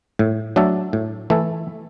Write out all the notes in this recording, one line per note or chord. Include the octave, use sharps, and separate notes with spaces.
A2
F#3 A3 D4 A4
A2
E3 A3 E4 A4